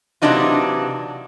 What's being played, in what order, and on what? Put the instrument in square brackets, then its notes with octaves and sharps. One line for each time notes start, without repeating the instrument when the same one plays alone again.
[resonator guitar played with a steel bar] C3 E3 F#3 D4 D#4 F4